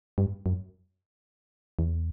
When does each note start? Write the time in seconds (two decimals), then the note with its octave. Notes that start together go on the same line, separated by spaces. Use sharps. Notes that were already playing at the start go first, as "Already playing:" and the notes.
0.18 G2
0.46 F#2
1.79 E2